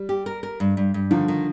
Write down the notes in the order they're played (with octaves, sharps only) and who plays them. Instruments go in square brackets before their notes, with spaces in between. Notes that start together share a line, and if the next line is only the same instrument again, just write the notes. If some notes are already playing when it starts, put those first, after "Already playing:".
Already playing: [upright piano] G3
[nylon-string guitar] G4
A#4
A#4
G2
G2
G2
[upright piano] D3 F3 [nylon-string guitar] D#3
[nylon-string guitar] D#3